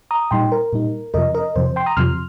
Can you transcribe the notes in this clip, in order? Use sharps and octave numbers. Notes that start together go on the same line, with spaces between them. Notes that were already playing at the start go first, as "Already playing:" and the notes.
A#5 D#6
A#2 G3 D#4 G5 C6
A#4
A#2 G3 D#4
F2 C3 F3 A#4 D#5
A#4 D#5
F2 C3 F3 C5
C5
G5 C6
A#5 D#6
F2 C3 F3 C6 F6